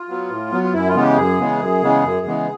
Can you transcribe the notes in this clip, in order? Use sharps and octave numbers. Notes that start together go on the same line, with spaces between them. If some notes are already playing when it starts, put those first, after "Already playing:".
Already playing: F4
F#3 B3
A2
F#3 B3
F4
F#2 E4
F4
C#3 E3 G#3 B3
G4
F#2 G#4
C#3 E3 G#3 B3
F#2
C#3 E3 G#3 B3
F#2
C#3 E3 G#3 B3